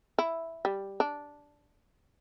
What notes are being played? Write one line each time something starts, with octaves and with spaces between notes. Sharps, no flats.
E4
G3
D4